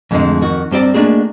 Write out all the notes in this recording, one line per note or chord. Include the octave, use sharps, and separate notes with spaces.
F2 G#2 D3 F3 G#3 A3
F2 D#3 F#4
G2 C4 G4 D5 A#5
A3 A#3 D4 D#4 F#4 G#4